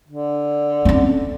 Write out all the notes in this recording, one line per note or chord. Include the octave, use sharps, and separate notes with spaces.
D3
C4 C#4